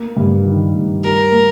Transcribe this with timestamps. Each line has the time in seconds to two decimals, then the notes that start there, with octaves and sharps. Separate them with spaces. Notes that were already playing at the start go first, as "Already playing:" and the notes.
Already playing: A#3
0.17 G2
0.45 D#3
0.74 G2
1.03 G3 A#4
1.31 A#3